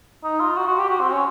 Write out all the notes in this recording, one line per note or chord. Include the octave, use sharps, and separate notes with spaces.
D#4
F4
F#4
F#4
G4
F#4
C4
C#4